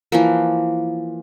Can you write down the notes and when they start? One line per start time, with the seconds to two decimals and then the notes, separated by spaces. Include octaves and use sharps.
0.12 E3 F3 A#3